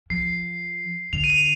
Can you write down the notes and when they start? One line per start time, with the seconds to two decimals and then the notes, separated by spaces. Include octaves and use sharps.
0.10 F3 C7
1.13 D3 F7
1.24 D#7
1.30 F7